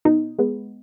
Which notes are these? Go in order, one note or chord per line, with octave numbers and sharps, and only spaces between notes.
B2 D#4
G#3 B3